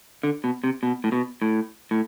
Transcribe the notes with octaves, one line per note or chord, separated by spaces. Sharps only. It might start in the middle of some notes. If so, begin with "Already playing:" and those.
D3
B2
C3
B2
A2
B2
A2
A2